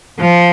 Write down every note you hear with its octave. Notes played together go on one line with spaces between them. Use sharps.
F3